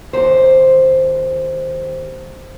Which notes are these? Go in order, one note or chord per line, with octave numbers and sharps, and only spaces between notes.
D#2 C5